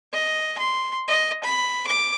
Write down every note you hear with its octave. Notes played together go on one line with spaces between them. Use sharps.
D#5
C6
D#5
B5
D6